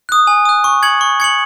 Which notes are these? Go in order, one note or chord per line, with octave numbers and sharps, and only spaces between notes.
D#6 F#6
G#5
D#6 F#6
C#6
G#6 C#7 F#7
C#6
G#6 C#7 F#7